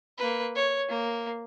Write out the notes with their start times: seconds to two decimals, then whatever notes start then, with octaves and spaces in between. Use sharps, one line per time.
0.18 A#3 B4
0.56 C#5
0.89 A#3